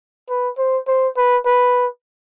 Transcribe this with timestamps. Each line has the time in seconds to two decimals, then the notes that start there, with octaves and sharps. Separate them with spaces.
0.29 B4
0.58 C5
0.88 C5
1.17 B4
1.46 B4